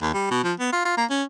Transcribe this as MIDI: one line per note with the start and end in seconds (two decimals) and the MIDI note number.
0.02 0.12 39
0.14 0.29 55
0.31 0.44 47
0.44 0.53 53
0.59 0.69 59
0.72 0.81 65
0.85 0.94 65
0.97 1.05 58
1.10 1.23 61